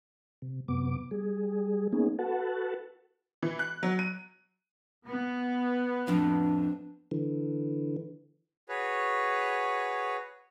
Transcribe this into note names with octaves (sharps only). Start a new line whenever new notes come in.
C3
F#2 C3 B3 D6
G3 G#4
A#3 B3 C#4 D#4 G#4
F#4 A4 B4 F#5 A5
E3
F#6
F#3
D#7
B3
F2 A2 F3 D4
D3 E3
F#4 G#4 B4 C#5